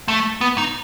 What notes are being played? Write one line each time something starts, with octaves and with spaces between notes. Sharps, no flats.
A3
B3
D#4